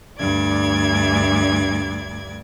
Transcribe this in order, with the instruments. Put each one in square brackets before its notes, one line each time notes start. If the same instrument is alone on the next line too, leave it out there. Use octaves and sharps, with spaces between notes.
[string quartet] D2 G2 D5 G#6